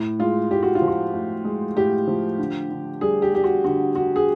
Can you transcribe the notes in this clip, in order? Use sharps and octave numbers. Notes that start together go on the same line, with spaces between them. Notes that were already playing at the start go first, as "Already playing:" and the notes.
Already playing: A2
G#3 F4
A2 G4
F#4
F4
F3
F#4
A2
G#3
A2 G4
F3
D3
D3
G3 G#4
G4
G3 G4
F#4
D3 F#4
D3 F#4
G#4